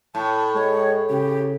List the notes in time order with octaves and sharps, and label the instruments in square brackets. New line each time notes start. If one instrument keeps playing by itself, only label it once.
[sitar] A2 [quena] A5
[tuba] G#3 [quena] C#5
[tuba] C#3 [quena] G4